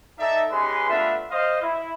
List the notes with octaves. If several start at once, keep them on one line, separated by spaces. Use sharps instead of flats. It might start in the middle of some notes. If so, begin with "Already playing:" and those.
D#4 A4 D5 E5 A#5
G#3 C#4 D#4 G4 B4 C6
A3 B3 D4 F4 E5
C5 D#5 F5
E4